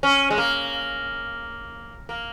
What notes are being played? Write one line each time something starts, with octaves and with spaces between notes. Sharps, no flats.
C#4
G#3
A#3
A#3